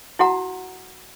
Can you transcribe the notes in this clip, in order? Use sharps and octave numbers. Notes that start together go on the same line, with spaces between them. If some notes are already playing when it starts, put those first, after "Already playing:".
E4 F#4 F#5 A#5